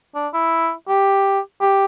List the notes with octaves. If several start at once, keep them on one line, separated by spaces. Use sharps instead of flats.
D4
E4
G4
G4